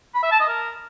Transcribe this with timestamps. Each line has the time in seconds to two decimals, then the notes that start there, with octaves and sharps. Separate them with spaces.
0.14 B5
0.23 E5
0.31 A5
0.40 D#5
0.48 A#4